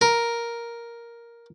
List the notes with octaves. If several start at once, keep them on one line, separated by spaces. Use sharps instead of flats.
A#4